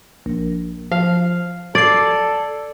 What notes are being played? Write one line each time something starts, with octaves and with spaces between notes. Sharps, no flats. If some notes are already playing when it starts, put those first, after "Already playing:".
A#1
F3 F5
A4 D5 G#6 C7